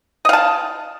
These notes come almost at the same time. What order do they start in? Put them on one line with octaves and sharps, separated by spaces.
D#5 F5 A5